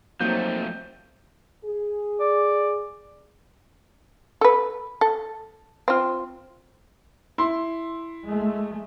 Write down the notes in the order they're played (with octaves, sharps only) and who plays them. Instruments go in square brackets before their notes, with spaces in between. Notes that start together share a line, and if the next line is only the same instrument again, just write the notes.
[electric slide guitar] F3 A3 [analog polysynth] F#3 A#3 D#4 [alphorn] C4 [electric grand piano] G6
[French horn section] G#4
[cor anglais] D5
[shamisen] A4 B4
A4
C4 F4
[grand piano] E4 C6
[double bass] G#3 A3